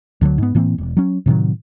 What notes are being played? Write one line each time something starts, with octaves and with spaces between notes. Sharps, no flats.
D2 D3 D#3 F#3
G#2 B3
A2 E3 A#3 C4
E1
F#3 C#4
A2 C3 D#3 F#3